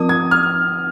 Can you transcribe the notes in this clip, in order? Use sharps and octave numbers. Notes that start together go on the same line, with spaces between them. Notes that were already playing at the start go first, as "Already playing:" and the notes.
Already playing: F3 C4 F4 A#4 D#6
G#6
F6